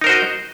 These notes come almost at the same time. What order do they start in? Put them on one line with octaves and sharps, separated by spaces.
D#4 A#4 C5 F#4 D#5